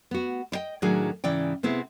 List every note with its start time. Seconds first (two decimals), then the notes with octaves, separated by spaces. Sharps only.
0.11 B3 F#4
0.52 E4 D#5 G5
0.82 A2 D#3 F#3 D4 G#4 G#5
1.24 G#2 C#3 E3 D5 G5
1.63 C3 B3 C4 E4 G#4